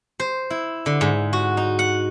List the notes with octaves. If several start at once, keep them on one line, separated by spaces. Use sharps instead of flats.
C5
E4
D3
G#2
F#4
D#4
F#5